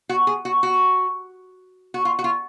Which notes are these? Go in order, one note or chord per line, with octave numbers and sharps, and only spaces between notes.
F#4
G#4
F#4
F#4
F#4
F4
F#4
F4